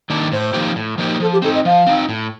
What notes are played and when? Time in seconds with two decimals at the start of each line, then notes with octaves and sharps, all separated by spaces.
0.10 D#3 A#3 D4
0.32 A2 C5
0.54 F3 A#3 D#4 G4
0.76 A2
0.98 F3 A#3 D#4 G4
1.20 F3 A4
1.32 G4
1.42 C4 D#4 A4
1.54 D#5
1.65 F3 F5
1.87 C4 D#4
2.09 A2